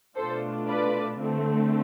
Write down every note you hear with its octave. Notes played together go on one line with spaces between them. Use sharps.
B2 A3 D4 F4 A4 C5
B4 D5
D3 A3 C4